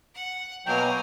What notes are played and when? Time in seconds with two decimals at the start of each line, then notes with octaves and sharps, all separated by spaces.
0.14 F#5
0.66 B2 F#3 A#3 G5 G#5